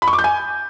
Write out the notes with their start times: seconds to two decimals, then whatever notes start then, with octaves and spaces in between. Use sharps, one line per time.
0.02 B5
0.08 C#6
0.13 D6
0.19 G6
0.24 G#5